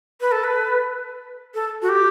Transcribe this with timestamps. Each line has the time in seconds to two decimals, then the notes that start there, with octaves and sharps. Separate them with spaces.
0.21 B4
0.32 A4
0.44 B4
1.54 A4
1.82 F#4
1.89 G4